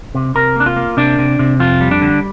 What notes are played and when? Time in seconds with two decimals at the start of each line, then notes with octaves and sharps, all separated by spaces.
0.15 C3
0.35 C3 A#4
0.56 A#3 D4
0.66 F4
0.76 A#3
0.97 C3 D4
1.19 C3
1.39 C3
1.60 F2 F4
1.81 G3
1.91 D4
2.01 D3